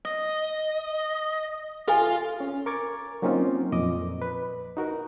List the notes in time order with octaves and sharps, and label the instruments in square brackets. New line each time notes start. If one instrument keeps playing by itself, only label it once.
[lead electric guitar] D#5
[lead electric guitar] F4 [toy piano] A4 G#5
[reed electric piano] C#4
A#4 C#6 D6 G#6 A6
F#3 A#3 C4 C#4 D#4 F4
F2 A#2 D#5 D6
B4
D#4 F#4 A#4